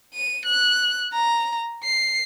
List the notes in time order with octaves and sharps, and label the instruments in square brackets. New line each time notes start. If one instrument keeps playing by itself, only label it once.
[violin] D#7
F#6
A#5
C7